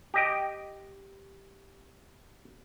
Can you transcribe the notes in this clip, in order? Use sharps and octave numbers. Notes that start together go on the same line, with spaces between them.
G4 D#5 G5